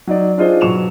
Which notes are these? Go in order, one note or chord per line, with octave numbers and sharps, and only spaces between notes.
F#3 D#4 D5
D4 D#4 F4 G#4 C5 D#5
B2 F#3 C#6 E7 F7